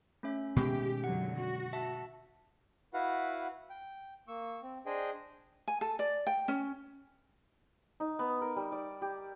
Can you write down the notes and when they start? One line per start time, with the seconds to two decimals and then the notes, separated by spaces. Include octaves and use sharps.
0.23 A3 C#4 E5
0.56 B2 D#3 G#3 G4
1.04 F#2 D3 F#3 F#5
1.37 F#4
1.73 E5 A5
2.94 E4 F#4 B4 F5 F#5
3.70 G5
4.28 A#3 C#6 E6
4.63 C4
4.86 D4 G#4 C5 D#5 G5
5.68 G#5
5.81 A4
5.99 D5
6.27 G5
6.48 C#4
8.00 D#4
8.19 B3
8.41 A#4
8.56 G3
8.72 D5
9.02 G4